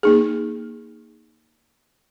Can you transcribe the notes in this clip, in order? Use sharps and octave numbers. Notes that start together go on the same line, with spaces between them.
A#3 D#4 G#4